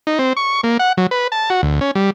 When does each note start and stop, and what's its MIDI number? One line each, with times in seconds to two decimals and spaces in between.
0.07 0.19 63
0.19 0.33 60
0.37 0.61 85
0.63 0.77 58
0.79 0.93 78
0.97 1.07 54
1.11 1.27 71
1.32 1.50 81
1.50 1.61 66
1.63 1.80 38
1.81 1.91 61
1.95 2.10 55